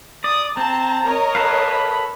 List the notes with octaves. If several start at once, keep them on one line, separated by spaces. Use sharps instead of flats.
D5 D#6
C4 A5 A#5
A#4 C#5 D#5
A4 B4 F5
B5